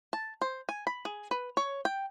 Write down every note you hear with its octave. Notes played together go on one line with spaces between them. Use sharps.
A5
C5
G#5
B5
G#4
B4
C#5
G5